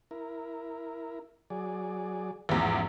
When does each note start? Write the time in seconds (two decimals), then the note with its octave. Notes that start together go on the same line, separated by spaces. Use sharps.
0.11 E4 A#4
1.50 F#3 G#4 D5
2.49 A1 E2 G#2 E3 F3